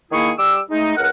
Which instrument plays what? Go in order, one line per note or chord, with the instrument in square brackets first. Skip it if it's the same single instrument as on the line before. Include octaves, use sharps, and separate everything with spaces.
[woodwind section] D#3 A#3 E4 G#4 C#6
G3 D6 E6
G#3 A3 D#4
C#2 A#4 F#5